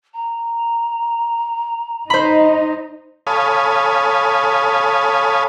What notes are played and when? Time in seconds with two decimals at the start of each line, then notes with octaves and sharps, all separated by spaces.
0.14 A#5
2.10 D#4 C5 B5
3.27 A4 C#5 F5 G#5 B5 D#6